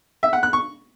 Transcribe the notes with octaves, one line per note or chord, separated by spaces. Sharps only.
E5
F#5
F#6
C#6